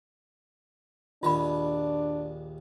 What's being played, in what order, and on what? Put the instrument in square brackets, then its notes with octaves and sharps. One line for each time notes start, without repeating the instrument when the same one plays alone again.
[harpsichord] A#1 D#2 C#5 [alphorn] D4 [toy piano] F4 B5